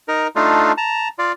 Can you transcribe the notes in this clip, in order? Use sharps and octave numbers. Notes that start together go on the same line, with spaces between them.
D#4 A#4
A3 D4 D#4 F4
A5 A#5
F4 D5